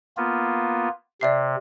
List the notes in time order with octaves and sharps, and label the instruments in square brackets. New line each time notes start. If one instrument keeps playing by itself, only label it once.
[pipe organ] A#3 B3 F4
[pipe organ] C3 [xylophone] D5 E5 C7